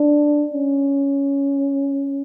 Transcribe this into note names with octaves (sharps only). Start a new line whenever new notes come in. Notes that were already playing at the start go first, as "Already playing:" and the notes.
Already playing: D4
C#4